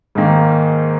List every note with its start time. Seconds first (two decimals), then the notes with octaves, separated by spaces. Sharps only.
0.15 G#2 D#3 A#3